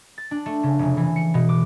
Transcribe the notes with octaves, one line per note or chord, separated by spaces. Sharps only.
A6
D4
A3
C#3
F1
E3
C#7
B2
D6